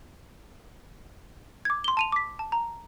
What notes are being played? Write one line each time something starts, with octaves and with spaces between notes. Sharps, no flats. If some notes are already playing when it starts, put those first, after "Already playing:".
D6 G#6
C6 G7
A5 D#7 F7
D6 B6
A5
A#5